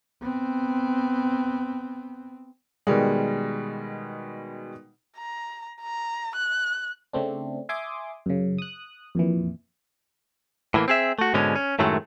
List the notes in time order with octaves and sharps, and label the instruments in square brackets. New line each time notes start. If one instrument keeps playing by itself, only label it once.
[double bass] B3 C4
[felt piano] B2 D#3 G3 G#3
[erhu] A#5
A#5
F#6
[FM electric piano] C#3 A3 C4 D4
E5 G#5 C6 D6 D#6
F#2 C#3
D#6 F#6
F2 A#2 E3
[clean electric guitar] A2 E3 A#3
C4 G#4 E5
A3 F#4
G#2 B2 D3 G#3 C#4
C#4
F#2 A2 D#3 F#3 G#3 A3